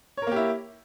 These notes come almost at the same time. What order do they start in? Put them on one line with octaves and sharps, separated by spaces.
C#5 A#4 A#3 G4 E4